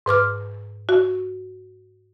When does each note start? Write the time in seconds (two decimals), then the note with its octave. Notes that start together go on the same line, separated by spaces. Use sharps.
0.06 G#2 B4 D6 F6
0.89 F#4